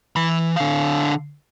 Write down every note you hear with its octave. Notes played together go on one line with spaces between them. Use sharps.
E3 B5
D3 F5